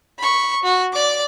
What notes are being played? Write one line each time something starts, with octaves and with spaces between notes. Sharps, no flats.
B5 C#6
F#4
D5 D6